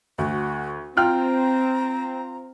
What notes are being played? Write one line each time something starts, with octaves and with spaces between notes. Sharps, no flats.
D2 F#4
C4 F4 G5 A#5 F6